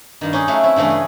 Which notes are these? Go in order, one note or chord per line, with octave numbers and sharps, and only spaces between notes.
G2 D#3
C#4 D#4 G4 G#4
F#3 A3 E4 F5 F#5
C4 E4
G2 C#3 E3 A3 C#4
G#4